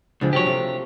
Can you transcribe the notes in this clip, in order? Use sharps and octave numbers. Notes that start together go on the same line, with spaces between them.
C#2 D3 F3 G#3
F3 F#3 G4 C#5
C3 A3